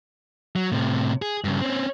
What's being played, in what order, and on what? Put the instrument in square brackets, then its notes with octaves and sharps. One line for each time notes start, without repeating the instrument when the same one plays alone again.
[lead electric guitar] F#3
A2 C3
G#4
G2 C#3
C4 C#4